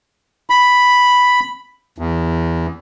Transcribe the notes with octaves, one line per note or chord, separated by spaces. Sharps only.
B5
E2